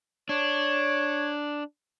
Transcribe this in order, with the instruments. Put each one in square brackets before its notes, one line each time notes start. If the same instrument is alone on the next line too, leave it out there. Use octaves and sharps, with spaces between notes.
[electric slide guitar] D4 [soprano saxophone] C#5